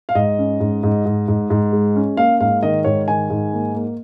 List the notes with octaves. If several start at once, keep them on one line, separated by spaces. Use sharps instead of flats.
F5
G#2 D#5
C#4
G#2
G#2
G#2
G#2
G#2
G#3
C#4
A#3 F5
G#2 F5
D#3 D#5
G#2 C#5
D#3 G#5
G#2
A#3
A#3